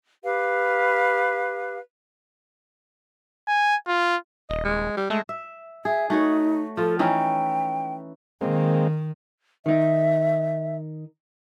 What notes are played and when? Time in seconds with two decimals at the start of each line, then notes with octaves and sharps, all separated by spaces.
0.23 G4 B4 F5
3.48 G#5
3.87 F4
4.50 D#1 D#5
4.64 G#3
4.97 G3
5.10 G#3 A3
5.29 E5
5.85 G#4 E5
6.10 A3 D#4 F#4 C#5
6.77 F3 F4 A4
6.99 E3 C#4 D#4 G5
8.41 D#3 G#3 A#3 C4
9.66 D#3 D#4 E5